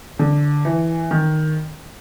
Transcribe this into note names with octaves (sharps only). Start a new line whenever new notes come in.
D3
E3
D#3